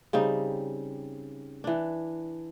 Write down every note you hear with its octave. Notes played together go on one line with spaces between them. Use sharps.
C#3 G3 C4 D#4
E3 D4